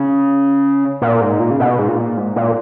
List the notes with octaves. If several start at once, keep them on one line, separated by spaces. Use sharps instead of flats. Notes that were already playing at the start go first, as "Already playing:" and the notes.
Already playing: C#3
A#2
G#2
A#2
C#3
B2
G#2
A#2
G#2
A#2